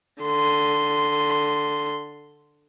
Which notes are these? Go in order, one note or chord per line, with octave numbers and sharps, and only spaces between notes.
D3 C6